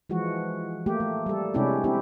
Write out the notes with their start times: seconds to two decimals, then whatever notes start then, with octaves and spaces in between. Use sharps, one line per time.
0.10 E3 F3 G#3 F#4
0.86 A3 A#3 G4
1.00 A3
1.26 G3 A4
1.54 C3 G#3 C#4 D4 E4 G4
1.84 C4 D4 E4 G4